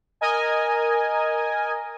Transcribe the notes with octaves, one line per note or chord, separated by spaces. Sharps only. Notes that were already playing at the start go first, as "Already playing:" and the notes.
A#4 D#5 G#5